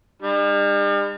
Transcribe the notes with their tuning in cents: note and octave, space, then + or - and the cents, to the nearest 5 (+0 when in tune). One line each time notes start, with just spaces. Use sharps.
G3 +45 D4 +45